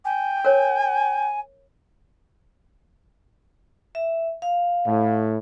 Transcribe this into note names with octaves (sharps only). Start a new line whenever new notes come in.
G5 G#5
A#4 C#5 G#5
E5
F5
A2